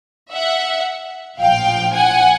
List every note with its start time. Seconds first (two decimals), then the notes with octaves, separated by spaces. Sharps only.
0.32 E5 F#5
1.39 A#1 A2 F3 F5 G5
1.94 F#5 G#5